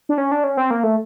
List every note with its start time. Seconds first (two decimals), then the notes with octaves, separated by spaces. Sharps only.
0.09 D4
0.18 C#4
0.32 D4
0.44 C#4
0.57 C4
0.71 A#3
0.84 A3